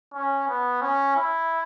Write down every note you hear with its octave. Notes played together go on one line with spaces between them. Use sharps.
C#4
B3
C#4
E4